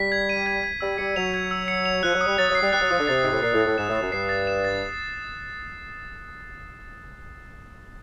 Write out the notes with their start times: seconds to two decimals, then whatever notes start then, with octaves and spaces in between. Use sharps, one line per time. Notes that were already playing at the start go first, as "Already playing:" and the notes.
Already playing: G3 B6
0.12 G#6
0.29 D#7
0.46 G#6
0.63 G#6
0.80 G3 E6
0.98 G3 C#7
1.16 F#3 F7
1.34 G#6
1.51 E6
1.68 C#7
1.86 F7
2.03 F3 F#6
2.15 F#3
2.21 D#6
2.26 G3
2.38 F#3 A6
2.49 F#3
2.55 C7
2.62 G3
2.73 G3 F#6
2.81 F#3
2.91 F3 D#6
2.99 D3
3.07 C3 A6
3.23 G#2 C7
3.32 A2
3.42 A#2 C7
3.54 A2
3.61 A6
3.66 A2
3.78 G#2 E7
3.89 A2
3.95 A6
4.01 F#2
4.12 G2 C7
4.29 A6
4.47 E7
4.65 A6